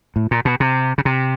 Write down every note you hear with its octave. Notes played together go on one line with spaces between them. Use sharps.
A2
A#2
B2
C3
C#3
C3